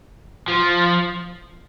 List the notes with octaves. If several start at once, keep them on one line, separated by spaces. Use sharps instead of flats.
F3